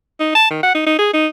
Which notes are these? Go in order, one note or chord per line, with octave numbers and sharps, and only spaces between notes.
D#4
A5
D#3
F#5
D#4
D#4
G#4
D#4